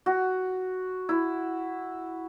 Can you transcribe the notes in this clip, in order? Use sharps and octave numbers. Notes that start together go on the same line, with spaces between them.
F#4
E4